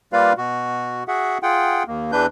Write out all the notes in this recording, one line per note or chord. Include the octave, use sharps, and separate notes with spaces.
G3 A#3 F4 B4 D5 F5
B2 F#4
F#4 G#4 E5 F#5
F4 G#4 F#5 G5
D#2 A#3
E2 E3 D4 B4 G6